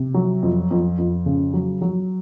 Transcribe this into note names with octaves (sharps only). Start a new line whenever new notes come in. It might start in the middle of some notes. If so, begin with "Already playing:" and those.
Already playing: C3
F#3
F2
F2
F2
C#3
F#3
F#3